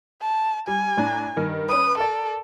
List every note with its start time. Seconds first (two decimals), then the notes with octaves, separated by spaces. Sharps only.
0.22 A5
0.67 G3 G#5
0.97 A2 D4 A#5
1.36 G2 D#3
1.69 C#4 B4 D#6
1.98 A4 A#4 D5